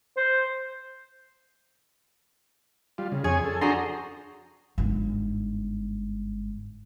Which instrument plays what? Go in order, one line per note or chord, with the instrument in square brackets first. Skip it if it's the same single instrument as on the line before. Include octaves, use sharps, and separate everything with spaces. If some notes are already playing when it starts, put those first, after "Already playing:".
[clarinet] C5
[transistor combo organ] G3 F4
C#3
[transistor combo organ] F2 C#5 G#5 [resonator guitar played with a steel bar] G#4
[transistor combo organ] A4
[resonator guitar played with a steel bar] F3 F#4 G#4 [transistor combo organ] D4 A#5 C6
[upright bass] G1 G#2